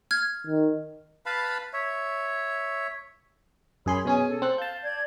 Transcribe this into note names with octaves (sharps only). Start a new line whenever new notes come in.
F6 G#6
D#3
B4 F5 A5 B5
C#5 E5
F#2 G#4 C#5 B5 C6
B2 C#4 G#4 G#5
A4
C4 F#6
F5 A5 G6
D5 G#6